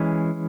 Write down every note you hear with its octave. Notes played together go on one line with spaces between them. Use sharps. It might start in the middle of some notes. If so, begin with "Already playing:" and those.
Already playing: E3 G#3 C#4